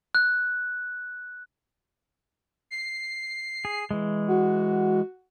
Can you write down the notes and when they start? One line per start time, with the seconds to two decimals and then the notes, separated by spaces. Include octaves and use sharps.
0.15 F#6
2.71 C7
3.65 G#4
3.91 E3 G#3
4.28 F#4